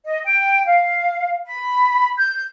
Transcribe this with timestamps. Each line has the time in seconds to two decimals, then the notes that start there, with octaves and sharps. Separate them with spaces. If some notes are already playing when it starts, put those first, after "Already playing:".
0.05 D#5
0.24 G5
0.65 F5
1.45 B5
2.18 G6